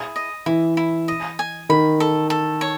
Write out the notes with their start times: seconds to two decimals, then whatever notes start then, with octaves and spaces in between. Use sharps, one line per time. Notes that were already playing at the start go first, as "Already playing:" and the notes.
Already playing: E4 G#4
0.16 D#5
0.46 E3 E4
0.77 E4
1.08 D#5
1.39 G#5
1.69 D#3 B5
2.00 A4
2.30 A4
2.61 C#5